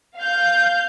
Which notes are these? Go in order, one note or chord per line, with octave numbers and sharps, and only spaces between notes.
F5 G6